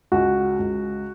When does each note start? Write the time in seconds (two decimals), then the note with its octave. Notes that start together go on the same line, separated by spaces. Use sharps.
0.12 C#2 F#4
0.59 C#2